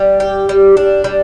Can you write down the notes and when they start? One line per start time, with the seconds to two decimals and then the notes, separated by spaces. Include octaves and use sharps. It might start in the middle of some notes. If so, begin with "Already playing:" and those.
Already playing: G3
0.20 G4
0.49 G3
0.77 D4
1.04 G3